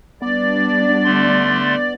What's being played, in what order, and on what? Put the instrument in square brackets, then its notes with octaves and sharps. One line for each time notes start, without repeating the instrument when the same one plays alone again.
[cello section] G3 D4 [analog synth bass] B3 [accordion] D5
[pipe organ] D3 A3 C6